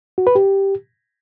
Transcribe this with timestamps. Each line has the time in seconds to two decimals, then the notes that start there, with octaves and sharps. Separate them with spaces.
0.18 F#4
0.27 B4
0.35 G4